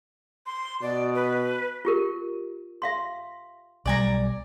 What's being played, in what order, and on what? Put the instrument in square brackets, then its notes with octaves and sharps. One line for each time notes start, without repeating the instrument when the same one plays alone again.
[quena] C6
[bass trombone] B2 [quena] D5
[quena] B4
[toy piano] F4 G4 A#4
E5 F5 C6
[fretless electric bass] B1 G3 [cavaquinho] D5 G#5 A#5